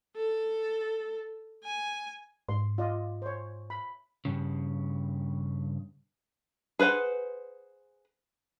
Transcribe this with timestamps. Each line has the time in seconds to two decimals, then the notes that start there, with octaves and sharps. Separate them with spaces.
0.16 A4
1.64 G#5
2.49 G#2 C6
2.78 F4 D5 D#5
3.22 C5 C#5
3.70 B5
4.25 G2 C#3
6.79 G#4 B4 C5 F#5